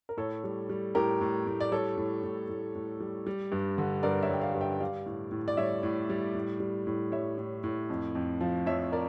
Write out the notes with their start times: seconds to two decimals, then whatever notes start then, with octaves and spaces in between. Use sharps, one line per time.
0.09 A#4
0.17 A2 A4 C#5
0.44 G3
0.69 G3
0.95 A2 G4 A#4
1.21 A2
1.47 A2
1.60 D5
1.72 G3 A4 C#5
1.97 A2
2.23 A2
2.49 A2
2.75 A2
3.00 G3
3.27 G3
3.52 G2
3.78 D3
4.03 G2 A#4 D5
4.23 C#5 E5
4.30 G2 G5
4.41 D5 F5
4.54 G2
4.61 E5 G5
4.80 G3 D5 F5
5.06 A2
5.31 A2
5.48 D5
5.57 G3 C#5 E5
5.83 A2
6.09 G3
6.35 A2
6.60 G3
6.87 A2
7.12 G3 C#5 E5
7.38 A2
7.64 A2
7.90 F2
8.15 F2
8.41 F3
8.66 F2 C#5 E5
8.92 A#4 D5